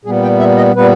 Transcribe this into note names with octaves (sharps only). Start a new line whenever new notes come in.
A#2 G3 B3 G#4
G5
E5
D#5
A#2 G3 B3 B4